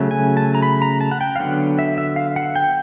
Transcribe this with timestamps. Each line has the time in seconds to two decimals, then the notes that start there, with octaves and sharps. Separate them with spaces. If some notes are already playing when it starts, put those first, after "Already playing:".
Already playing: C#3 F#3 A3
0.11 G#5
0.37 A5
0.55 A#5
0.62 B5
0.82 A#5
1.01 A5
1.11 F#5
1.21 G5
1.36 F5
1.39 D3 F#3 B3 F#5
1.79 E5
1.98 E5
2.16 F5
2.36 F#5
2.56 G5